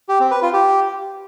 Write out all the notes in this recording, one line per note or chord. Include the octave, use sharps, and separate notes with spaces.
G4
C4
B4
F4
G4